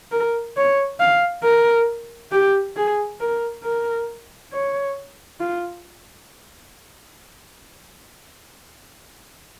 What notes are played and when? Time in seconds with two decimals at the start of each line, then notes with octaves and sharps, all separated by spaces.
0.12 A#4
0.57 C#5
1.00 F5
1.44 A#4
2.32 G4
2.76 G#4
3.20 A#4
3.64 A#4
4.53 C#5
5.40 F4